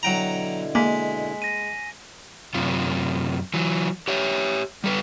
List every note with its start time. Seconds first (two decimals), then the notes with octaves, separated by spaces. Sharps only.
0.03 B2 D3 F#3 E4 G5 A#5
0.75 G#3 A#3 G#5 B6
1.42 A#6 D#7
2.54 F#2 C3 F4
3.54 E3 F#3
4.08 G4 C#5 E5
4.84 G3 A4 B4